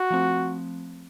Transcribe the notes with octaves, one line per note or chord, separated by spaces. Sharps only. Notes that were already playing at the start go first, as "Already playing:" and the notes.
Already playing: F#4
F3 A3 C4